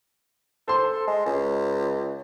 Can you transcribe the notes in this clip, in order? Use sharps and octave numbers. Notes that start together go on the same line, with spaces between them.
A4 C5 C6
G#3
C#2